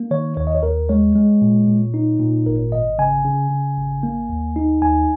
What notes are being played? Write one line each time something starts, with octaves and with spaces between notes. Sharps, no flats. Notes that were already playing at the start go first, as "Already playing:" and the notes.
Already playing: A#3
D#3 C#5
D#2 C#5
D#5
C#5
D#2 A#4
G#3 C#5
G#3
A#2
A#2
D#4
A#2
G#1 A#4
G#1 D#5
C#3 G#5
C#3
C#3
G#1
A#3
D#2
D#4
D#2 G#5